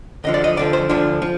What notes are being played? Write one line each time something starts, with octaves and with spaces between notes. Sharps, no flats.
D2 D3 F3 D#5
D5
D#5
D2 D3 F3 D5
C5
D2 D3 F3 D4
F3